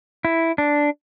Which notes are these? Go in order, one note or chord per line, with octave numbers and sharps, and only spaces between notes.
E4
D4